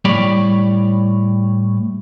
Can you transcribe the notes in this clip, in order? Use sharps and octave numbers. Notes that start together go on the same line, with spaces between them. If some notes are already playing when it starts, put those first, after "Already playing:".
A2 G3 C#5 D5 B5